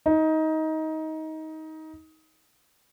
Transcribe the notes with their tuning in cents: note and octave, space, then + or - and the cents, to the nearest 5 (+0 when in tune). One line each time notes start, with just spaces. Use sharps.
D#4 +20